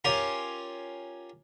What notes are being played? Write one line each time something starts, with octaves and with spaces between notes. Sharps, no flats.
C#4 F4 G4 A#4